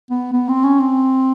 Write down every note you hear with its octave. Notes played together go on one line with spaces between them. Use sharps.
B3
B3
C4
C#4
C4